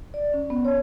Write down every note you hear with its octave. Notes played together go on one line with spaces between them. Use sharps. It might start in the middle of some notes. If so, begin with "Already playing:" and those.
D5
C#4
B3
C#5